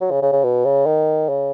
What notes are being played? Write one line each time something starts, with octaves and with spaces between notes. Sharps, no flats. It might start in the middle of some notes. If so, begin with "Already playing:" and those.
F#3
C#3
C#3
C#3
B2
C#3
D#3
C#3